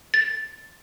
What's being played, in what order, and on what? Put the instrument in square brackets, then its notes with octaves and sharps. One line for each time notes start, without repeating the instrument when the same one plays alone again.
[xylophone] A6